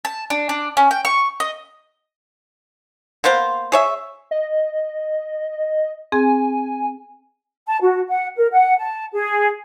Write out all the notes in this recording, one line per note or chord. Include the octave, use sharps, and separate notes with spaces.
A5
D4
D4
C#4
G5
C#6
D#5
A#3 B3 C5 F5
G#4 C#5 E5
D#5
C4 G#4 G#5
A5
F#4
F#5
A#4
F#5
A5
G#4